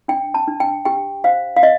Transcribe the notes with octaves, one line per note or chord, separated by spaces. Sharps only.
D4 G5
A5
D4
G5
G4 G5
C5 F5
F5
D#5